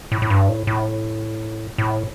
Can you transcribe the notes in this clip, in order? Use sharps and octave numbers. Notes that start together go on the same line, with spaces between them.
A2
A2
G2
A2
A2
A2